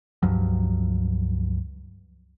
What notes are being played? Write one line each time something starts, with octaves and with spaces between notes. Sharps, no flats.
C#2 G2 F3 F#3